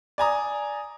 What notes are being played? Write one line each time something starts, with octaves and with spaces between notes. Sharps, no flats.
D5 G#5 A#5 D#6